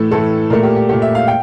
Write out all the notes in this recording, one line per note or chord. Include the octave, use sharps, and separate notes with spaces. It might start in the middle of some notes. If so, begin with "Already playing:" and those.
Already playing: A2 E3 A3 A4
A2 E3 A3 A4
A#2 A3 A#4
G4
G4
A#2 A3 G4
E5
F5
G5